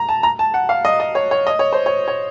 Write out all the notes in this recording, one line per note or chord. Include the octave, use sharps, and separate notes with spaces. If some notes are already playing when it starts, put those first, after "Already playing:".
Already playing: A#5
A5
A#5
A5
F#5
F5
D#5
D#5
C#5
C#5
D#5
C#5
C5
C#5
C#5